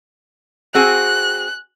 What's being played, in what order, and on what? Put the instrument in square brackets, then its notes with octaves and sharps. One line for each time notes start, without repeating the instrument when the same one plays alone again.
[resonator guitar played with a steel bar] C4 F#4 G#4 [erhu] F#6